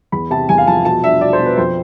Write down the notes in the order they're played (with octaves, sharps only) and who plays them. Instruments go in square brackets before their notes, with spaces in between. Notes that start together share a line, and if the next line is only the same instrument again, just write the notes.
[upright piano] E2 B5
C3 A5
E2 G#5
F5
F3 A5
B2 A5
D4 E5
B2 D5
C5
B2
B4
F2 C5